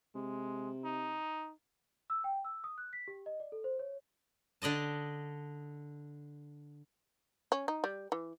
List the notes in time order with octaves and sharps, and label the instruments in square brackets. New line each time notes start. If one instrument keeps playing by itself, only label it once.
[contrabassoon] C3 [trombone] G#3
[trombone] D#4
[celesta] E6
G5
E6
D#6
F#6
B6
G4
D#5
D5
A4
C5
C#5
[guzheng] D3 D5 D#5 A5
[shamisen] C#4
D#4
G3
E3